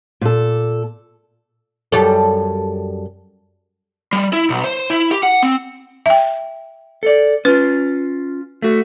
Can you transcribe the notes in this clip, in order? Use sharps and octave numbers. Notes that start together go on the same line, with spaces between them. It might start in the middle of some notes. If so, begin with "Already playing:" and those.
A#2 A4
F#2 G3 A4
G3
E4
B1
C5
E4
G4
F#5
C4
E5 G5
A4 D5
C#4 F4 B4
A3 F#4